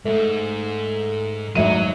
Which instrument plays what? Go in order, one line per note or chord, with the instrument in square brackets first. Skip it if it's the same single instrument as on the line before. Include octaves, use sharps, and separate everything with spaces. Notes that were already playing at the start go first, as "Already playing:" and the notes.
[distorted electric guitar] G#2 G#3 [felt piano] A3
[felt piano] G#1 E5 D#7 [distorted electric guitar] F#3